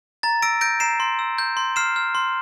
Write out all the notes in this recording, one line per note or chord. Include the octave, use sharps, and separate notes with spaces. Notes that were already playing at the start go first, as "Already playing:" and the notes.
A#5 A6
E6 A#6 D7
G6 A#6 D7
A#5 C7 E7
C6
E6
G6
C6
F6 C7 E7
F6
C6